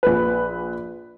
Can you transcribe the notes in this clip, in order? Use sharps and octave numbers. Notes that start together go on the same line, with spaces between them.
A#1 B4